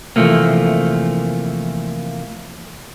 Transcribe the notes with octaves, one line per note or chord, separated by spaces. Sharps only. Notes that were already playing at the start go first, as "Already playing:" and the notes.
C3 E3 F3 A3 A#3